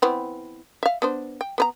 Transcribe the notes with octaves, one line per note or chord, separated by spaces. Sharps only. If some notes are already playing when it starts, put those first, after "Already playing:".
E3 B3 C4
E5 F5
B3 D4 C5
G5
B3 B4 A#5